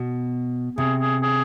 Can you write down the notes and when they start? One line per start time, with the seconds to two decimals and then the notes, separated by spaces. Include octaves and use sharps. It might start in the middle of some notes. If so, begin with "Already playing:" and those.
Already playing: B2
0.78 C3 G#4
1.00 G#4
1.23 G#4